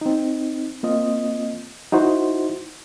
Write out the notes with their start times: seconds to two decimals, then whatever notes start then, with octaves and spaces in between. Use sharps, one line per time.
0.01 C4 D#4
0.83 A#3 C4 F4 D#5
1.92 D#4 E4 F#4 C5